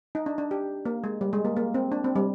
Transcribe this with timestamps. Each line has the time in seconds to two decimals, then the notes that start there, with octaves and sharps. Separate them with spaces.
0.15 D#4
0.26 D4
0.38 D4
0.51 G4
0.85 A#3
1.04 G#3
1.21 G3
1.33 G#3
1.45 A#3
1.56 A#3
1.74 C4
1.92 D4
2.04 C4
2.16 G3